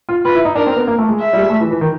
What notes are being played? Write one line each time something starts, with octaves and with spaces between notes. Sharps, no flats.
F4
F4 B4
E4
D#4
D4 A#4
C4
B3
A#3
A3
G#3
E5
G3
G#3
A3
E3
E3
D#3